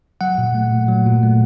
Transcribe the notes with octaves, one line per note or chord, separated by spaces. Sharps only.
F#3 F#5
A#2
A3
A#2
F#3
A#2
A3